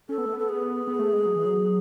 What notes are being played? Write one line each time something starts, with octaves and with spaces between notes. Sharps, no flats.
C#4 A4
B3
A3
B3
A4
G#4
B3
A3
G#3
F#3
E3
F#3